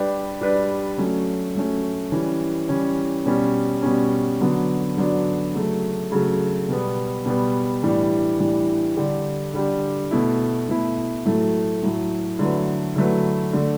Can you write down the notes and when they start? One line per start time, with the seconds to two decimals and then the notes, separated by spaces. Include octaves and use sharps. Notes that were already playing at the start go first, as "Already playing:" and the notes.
Already playing: G3 D4 G4 B4 D5
0.41 G3 D4 G4 B4 D5
0.98 F#3 A3 C#4
1.55 F#3 A3 C#4
2.12 E3 G3 C#4
2.69 E3 G3 C#4
3.26 B2 G3 C#4
3.83 B2 G3 C#4
4.40 D3 F#3 B3 D4
4.97 D3 F#3 B3 D4
5.54 C#3 F#3 A3
6.12 C#3 F#3 A3
6.69 B2 G3 B3
7.26 B2 G3 B3
7.83 A2 E3 G3 D4
8.40 A2 E3 G3 D4
8.97 D3 G3 D4 G4
9.54 D3 G3 D4 G4
10.11 B2 A3 E4
10.68 B2 A3 E4
11.25 A2 F#3 A3
11.83 A2 F#3 A3
12.39 D3 F#3 A3 E4 B4
12.96 D3 F#3 A3 E4 B4
13.53 D3 A3 D4